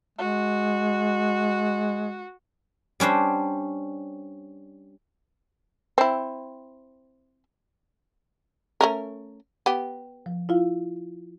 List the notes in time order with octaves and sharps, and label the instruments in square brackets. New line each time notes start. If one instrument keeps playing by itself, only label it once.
[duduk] G#3 [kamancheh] F#4
[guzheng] G3 C#4 D4 C5
[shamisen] C4 E4
A3 C#4 A#4
B3 G4
[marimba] F3
E4 F4 F5